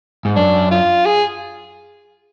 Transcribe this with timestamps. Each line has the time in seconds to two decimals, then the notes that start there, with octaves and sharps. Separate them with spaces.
0.25 G#2
0.36 F#2 D4
0.71 F4
1.06 G#4